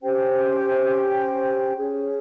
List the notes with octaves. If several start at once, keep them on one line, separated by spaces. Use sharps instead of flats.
C#4 G4 C5 G5
C#4 G#4 C#5